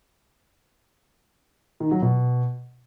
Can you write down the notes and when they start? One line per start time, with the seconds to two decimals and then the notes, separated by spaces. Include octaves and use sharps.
1.80 D#3
1.91 F#3
2.02 B2